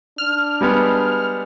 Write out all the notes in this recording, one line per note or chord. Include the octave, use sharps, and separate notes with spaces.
D4 F6
G3 G#3 B3